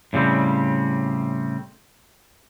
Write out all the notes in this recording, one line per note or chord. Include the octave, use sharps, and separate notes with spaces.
A2 C#3 G3 C4